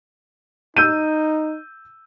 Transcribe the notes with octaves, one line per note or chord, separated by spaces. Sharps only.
D#4 E6 G6 D#7